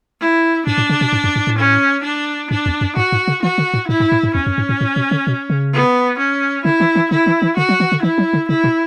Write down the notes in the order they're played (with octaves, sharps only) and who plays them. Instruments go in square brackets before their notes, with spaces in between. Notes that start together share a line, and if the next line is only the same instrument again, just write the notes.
[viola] E4
[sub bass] G#2 [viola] D4
[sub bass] A2
C#3
B2
G#2
F#2
G#2
A2
[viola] C#4
D4
[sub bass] G#2 [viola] D4
[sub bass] E2
F#2
[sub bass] G#2 [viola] F#4
[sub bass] G#2
C#3
[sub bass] E3 [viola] F#4
[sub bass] D3
A2
[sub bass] A2 [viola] E4
[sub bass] G#2
A2
G#2
[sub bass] E2 [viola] C#4
[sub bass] F#2
G#2
A2
A2
B2
D3
B2
C#3
[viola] B3
C#4
[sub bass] D3 [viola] E4
[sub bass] E3
E3
[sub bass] D3 [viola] E4
[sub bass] E3
E3
[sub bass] D3 [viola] F#4
[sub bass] F#3
E3
D3
[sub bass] E3 [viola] E4
[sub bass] F#3
D3
[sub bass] C#3 [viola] E4
[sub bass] B2